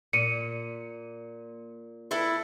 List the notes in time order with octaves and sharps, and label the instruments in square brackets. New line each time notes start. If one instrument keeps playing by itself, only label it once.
[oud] A#2 [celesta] C#7 D#7
[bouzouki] E4 A4 B4